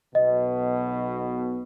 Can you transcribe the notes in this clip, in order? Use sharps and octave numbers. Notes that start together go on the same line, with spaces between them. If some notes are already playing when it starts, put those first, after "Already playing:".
B1 B2 D#5